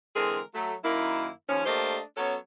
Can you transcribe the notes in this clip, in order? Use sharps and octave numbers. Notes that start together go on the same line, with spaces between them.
D3 E3 G#3 C4 G#4 A#4
F#3 A3
F#2 D#3 A#3 E4
D#2 F3 C#4
A3 A#3 D4 G4 C5 D#5
F#3 B3 C#4 A4 C#5